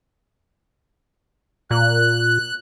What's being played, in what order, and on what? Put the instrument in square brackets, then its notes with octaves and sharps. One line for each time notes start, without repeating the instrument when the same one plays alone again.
[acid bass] A#2 [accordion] F#6